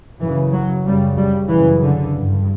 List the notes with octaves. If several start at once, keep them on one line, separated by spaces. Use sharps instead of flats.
F#2 C#3 E3
F#3
F#2 C#3 G3
G3
F#2 C#3 E3
D3
G2